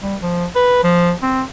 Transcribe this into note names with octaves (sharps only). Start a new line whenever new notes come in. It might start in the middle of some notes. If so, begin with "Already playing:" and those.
G3
F3
B4
F3
C4